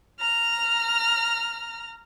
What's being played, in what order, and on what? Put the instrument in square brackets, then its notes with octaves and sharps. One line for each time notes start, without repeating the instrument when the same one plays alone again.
[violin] A#5 F6